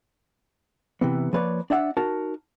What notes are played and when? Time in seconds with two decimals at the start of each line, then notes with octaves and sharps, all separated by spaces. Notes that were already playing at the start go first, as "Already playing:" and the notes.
1.01 C3 E3 B3
1.33 F3 A#3 B4 C#5 D5
1.70 D4 D5 E5 F#5
1.97 D#4 F#4 A#4 A5